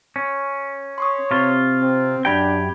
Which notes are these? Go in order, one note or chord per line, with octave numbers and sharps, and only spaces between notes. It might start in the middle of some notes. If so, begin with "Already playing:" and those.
C#4
C#5 C6 C#6 D#6
C3 F4
C4
F#2 D4 G4 G5 B5 G6 G#6